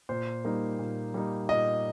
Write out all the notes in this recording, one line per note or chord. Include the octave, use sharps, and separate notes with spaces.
A#2 C5
G3 A#3 D#4
A#2
G3 A#3 D#4
A#2 D#5